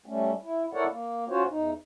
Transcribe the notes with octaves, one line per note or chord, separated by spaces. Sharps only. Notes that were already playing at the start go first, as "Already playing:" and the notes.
G3 A3 C#4
E4
E4 A4 A#4 C#5 D5 F#5
A#3
C#4 F4 F#4 C5 C#5
E2 D#4